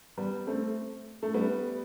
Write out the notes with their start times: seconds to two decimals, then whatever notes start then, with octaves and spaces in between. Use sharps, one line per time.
0.18 G3 B3
0.46 A3 C4
1.23 A3
1.34 G3 B3